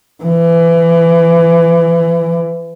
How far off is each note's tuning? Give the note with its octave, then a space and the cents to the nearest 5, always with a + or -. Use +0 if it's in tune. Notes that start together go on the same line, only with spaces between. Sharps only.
E3 +25